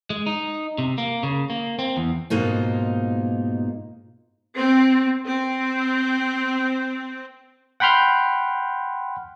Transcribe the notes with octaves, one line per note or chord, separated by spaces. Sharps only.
G#3
D#4
C3
A#3
C#3
A#3
C4
E2
G#2 B2 A#3 D#4 F4
C4
C4
F#5 G5 B5 C6 F6 G6